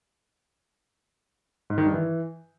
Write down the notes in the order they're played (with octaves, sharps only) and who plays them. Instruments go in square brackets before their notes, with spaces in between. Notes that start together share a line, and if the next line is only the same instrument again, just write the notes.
[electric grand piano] G#2
D#3
G2
E3